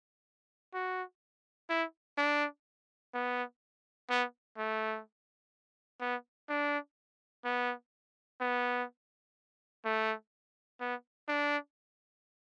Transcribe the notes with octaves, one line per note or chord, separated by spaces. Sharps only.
F#4
E4
D4
B3
B3
A3
B3
D4
B3
B3
A3
B3
D4